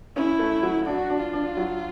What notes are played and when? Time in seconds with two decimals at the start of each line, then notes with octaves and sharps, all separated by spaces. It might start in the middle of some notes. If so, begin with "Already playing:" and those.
0.16 C#4 E4
0.39 A3
0.62 F#3
0.86 D4 F#4
1.09 D4
1.21 F4
1.33 D4
1.57 F#3